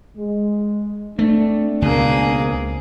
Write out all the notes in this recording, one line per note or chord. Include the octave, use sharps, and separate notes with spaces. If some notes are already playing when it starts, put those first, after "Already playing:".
G#3
A3 C4 D4
C#2 B2 A#3 G#4